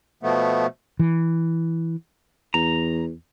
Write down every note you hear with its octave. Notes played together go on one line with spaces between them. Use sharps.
B2 F3 A3 B3
E3
E2 A#5